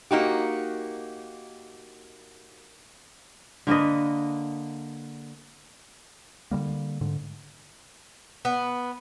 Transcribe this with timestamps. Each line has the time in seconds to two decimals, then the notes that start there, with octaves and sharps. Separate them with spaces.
0.11 A#3 D#4 F#4 G4
3.67 D3 A#3 B4 D#5
6.51 D3 D#3 G3 A#3
7.01 G#2 D3
8.45 B3